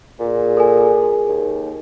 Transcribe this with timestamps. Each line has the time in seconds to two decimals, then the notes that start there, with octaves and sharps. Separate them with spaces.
0.20 A#2 G#4
0.57 A4 A#4 G#5
1.28 D#2